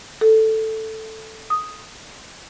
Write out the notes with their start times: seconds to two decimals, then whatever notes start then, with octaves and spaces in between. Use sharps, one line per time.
0.21 A4
1.50 D#6